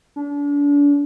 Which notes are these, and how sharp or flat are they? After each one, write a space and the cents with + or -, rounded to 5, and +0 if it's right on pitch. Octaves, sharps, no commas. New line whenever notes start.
D4 -35